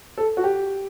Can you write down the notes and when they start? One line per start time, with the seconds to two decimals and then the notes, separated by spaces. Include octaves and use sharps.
0.18 A4
0.37 F#4
0.44 G4